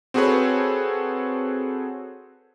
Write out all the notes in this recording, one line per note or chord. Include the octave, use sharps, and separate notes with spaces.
C4 F#4 G#4 A4 B4 C#5